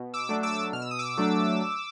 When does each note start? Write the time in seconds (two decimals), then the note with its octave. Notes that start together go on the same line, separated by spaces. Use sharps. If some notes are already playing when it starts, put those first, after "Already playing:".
Already playing: B2
0.14 D6 E6
0.29 F#3 A3 D4
0.43 D6 E6
0.73 B2 F6
0.82 E6
0.91 D#6
0.99 D6 E6
1.17 F#3 A3 D4